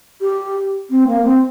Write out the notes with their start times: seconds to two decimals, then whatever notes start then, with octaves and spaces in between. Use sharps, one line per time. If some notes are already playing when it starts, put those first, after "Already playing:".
0.21 G4
0.90 C4
1.07 A#3
1.25 C4